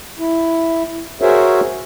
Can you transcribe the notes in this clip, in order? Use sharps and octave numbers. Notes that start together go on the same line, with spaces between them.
E4
F#4 G#4 A#4 C5 C#5 E5